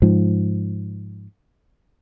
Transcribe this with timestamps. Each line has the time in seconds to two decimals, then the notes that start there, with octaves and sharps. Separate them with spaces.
0.02 G#2 F3